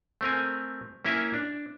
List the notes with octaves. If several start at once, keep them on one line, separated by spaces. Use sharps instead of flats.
A3 C4 A#4 G#5
A#3 C#4 E4 A#4 E5 G#5
D4